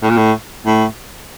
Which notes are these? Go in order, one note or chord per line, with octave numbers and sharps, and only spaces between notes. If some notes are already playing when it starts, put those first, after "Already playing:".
A2
A#2
A2
A2